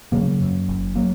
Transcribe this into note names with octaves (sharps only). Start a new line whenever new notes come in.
C#3 F#3 A#3
F#2
F#1
F#3 A#3